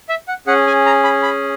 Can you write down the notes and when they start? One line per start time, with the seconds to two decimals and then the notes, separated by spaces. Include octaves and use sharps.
0.09 E5
0.28 F#5
0.47 C#4 G#4 F#5
0.67 G#5
0.86 A#5
1.04 B5
1.23 B5